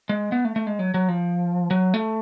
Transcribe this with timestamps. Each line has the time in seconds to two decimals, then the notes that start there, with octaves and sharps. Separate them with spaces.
0.09 G#3
0.32 B3
0.45 A3
0.56 A3
0.67 G#3
0.79 F#3
0.94 F#3
1.08 F3
1.71 F#3
1.94 A3